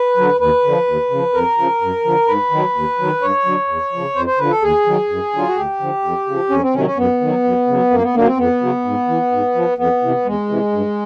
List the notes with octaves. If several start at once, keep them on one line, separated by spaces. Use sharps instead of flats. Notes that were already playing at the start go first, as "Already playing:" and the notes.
Already playing: B4
D3 F#3
D#2 B4
D3 F3
D#2
C#3 F3
F2 A#4
C#3 F3
F#2
D3 F3
G#2 B4
D#3 F#3
D#2
D#3 F#3
G2 C#5
D3 F#3
E2
C#3 F3
F2 C5
C5
D3 F3 B4
A4
D#2 G#4
D#3 F#3
F#2
D3 F#3 F4
F#4
D2 G4
D3 F3
F2
C#3 F3
F2 C#4
C4
C3 D#3 F#3 C#4
C#4
F#2 B3
D#3 F#3
F#2
C#3 F#3
F#2 A#3
B3
D3 F#3 A#3
C4
F2 B3
C#3 F#3
G#2
E3
G#2
F3
F2 B3
C3 E3
E2 G#3
C3 E3
G2